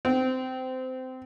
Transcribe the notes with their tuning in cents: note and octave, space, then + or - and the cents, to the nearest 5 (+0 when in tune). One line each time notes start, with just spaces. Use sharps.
C4 -20